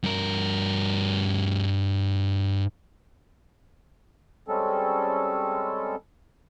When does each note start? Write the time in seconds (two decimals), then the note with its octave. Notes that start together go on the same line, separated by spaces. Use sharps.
0.03 G2 A#4
4.48 G3 G#3 C4 C#4 A4